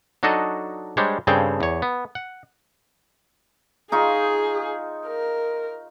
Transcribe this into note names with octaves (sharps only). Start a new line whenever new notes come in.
F#3 D4 D#4 F#4 A4 D#5
G3 G#3 D4 C5 C#5
G2 C#3 C4 G#4 A4 G5
E2 C#5
B3
F#5
D#4 F4 G#4 C#6
A#4